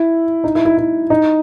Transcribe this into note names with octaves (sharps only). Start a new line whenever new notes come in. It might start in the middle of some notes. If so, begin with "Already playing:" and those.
Already playing: E4
D#4
E4
E4
E4
D#4